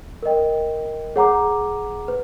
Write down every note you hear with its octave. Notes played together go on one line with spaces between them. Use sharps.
A#4 D#5 G5
G#4 C#5 F#5 A#5 D6
B4